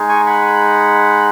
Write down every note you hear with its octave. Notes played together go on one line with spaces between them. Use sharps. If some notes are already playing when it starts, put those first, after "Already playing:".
Already playing: G#3 D#4 G#4
G#5 C#6
F#5 B5